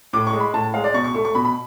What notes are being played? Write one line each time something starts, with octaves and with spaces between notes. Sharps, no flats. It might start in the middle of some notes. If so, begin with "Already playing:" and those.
A2 D6
C#6
G#3
B5
A2 A5
G#3 F5
D5
B2 C#6
C#6
A3 C#6
C#6
B2 B5
B5